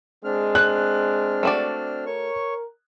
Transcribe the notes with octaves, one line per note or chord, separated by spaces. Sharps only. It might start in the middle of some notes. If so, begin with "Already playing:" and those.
G#3 C4 D4 F6
F#6
A3 F#4 D5
A#4 C#5 C#6